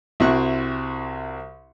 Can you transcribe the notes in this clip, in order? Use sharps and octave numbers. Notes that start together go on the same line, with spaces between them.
C2 C4 E4 F#4 C#6 F#6